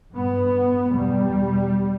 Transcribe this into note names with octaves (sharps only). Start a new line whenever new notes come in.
G2 B3
E2 B2 G3